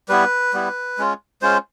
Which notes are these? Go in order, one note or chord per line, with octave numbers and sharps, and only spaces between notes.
G3 B3 E4 B4
G3 B3 E4
G#3 C#4 F4
G#3 C#4 F4 C5